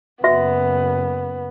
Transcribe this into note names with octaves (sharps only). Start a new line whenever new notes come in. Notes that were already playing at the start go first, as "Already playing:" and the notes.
F#1 B3 F#4 E5